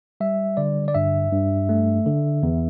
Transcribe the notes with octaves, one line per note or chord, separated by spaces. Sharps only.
G3 E5
D3 D5
D5
G2 E5
G2
A3
D3
E2